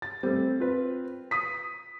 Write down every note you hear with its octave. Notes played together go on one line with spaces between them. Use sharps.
A6
G3 A3 C4
F4 B4
D#6 B6